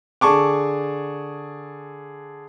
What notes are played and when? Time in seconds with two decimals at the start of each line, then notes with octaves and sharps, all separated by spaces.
0.21 D3 G#4 A5 C#6 D6